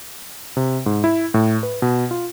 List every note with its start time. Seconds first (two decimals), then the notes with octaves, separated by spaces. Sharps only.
0.57 C3
0.86 G#2
1.04 E4
1.34 A2
1.63 B4
1.82 B2
2.11 F4